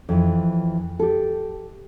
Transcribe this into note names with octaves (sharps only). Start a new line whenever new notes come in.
F2 E3
G4 A4